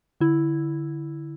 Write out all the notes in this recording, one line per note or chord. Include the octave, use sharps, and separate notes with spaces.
D3 E4